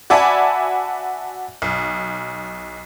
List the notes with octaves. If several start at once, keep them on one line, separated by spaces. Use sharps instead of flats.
F#4 D5 E5 G#5 A5 B5
B1